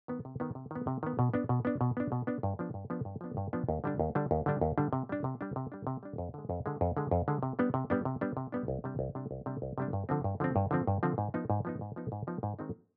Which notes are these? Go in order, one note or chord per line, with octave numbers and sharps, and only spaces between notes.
D#3 B3
C3
D#3 B3
C3
D#3 B3
C3
D#3 B3
B2
B3 D4
B2
B3 D4
B2
B3 D4
B2
B3 D4
G2
F3 B3 D4
G2
F3 B3 D4
G2
F3 B3 D4
G2
F3 B3 D4
D#2
D3 G3 D4
D#2
D3 G3 D4
D#2
D3 G3 D4
D#2
D3 G3 D4
C3
G3 D4
C3
G3 D4
C3
G3 D4
C3
G3 D4
F2
D3 G#3
F2
D3 G#3
F2
D3 G#3
F2
D3 G#3
C3
G3 B3 D4
C3
G3 B3 D4
C3
G3 B3 D4
C3
G3 B3 D4
C2
C3 G3 D4
C2
C3 G3 D4
C2
C3 G3 D4
C2
C3 G3 D4
G2
D3 F3 C4
G2
D3 F3 C4
G2
D3 F3 C4
G2
D3 F3 C4
G#2
F3 B3 D#4
G#2
F3 B3 D#4
G#2
F3 B3 D#4
G#2
F3 B3 D#4
G#2
D#3 G#3 C4 D#4